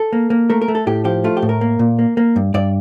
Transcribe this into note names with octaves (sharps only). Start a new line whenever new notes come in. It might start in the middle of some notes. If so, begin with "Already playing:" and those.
Already playing: A4
A#3
A#3
A3 A#4
A#4
A3
A4
A2 G4
F3 G4
A3 F4
G4
A2
A#4
A#3
A#2
A#3
A#3
G2
G2 D5